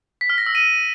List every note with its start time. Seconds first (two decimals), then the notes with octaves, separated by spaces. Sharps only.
0.21 B6
0.30 F6
0.38 A#6
0.46 E6
0.55 D#7